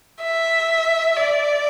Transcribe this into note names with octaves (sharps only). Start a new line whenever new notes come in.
E5
D5